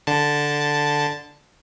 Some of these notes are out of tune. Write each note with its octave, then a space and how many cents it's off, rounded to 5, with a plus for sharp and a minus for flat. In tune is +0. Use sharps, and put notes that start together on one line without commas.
D3 +0 A5 +0